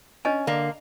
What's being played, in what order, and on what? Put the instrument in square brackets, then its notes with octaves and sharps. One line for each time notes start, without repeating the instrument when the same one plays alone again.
[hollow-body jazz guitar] C#4 [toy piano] D4 D#5 G#5
[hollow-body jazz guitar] D3 [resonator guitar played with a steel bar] A#3